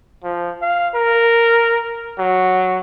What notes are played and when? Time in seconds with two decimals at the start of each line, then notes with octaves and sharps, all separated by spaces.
0.24 F3
0.62 F5
0.95 A#4
2.19 F#3